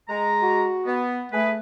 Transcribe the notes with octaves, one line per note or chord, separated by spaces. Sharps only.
G#3 A#5
F#4
B3
A3 G#4 B4